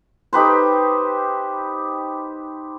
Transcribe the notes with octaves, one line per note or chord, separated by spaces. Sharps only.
D#4 G4 B4 C5